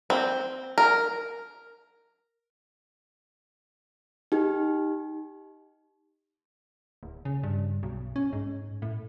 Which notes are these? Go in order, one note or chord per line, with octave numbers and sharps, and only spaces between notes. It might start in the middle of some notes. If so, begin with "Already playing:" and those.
C4
A#4
D#4 G4
D1
C#3
G2
B1
C#4
G#2
A2